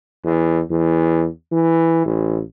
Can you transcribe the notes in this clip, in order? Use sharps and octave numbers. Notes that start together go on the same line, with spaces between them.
E2
E2
E3
A1